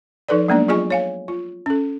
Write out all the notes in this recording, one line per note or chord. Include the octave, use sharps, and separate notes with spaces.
F3 D#4 A4 B4 D5
F#3 G#3 A#3 B3 D4 D5
F#3 F4 G#4 D#5 G#5 C#6
C#5 F5 G#5
F4
C#4 A4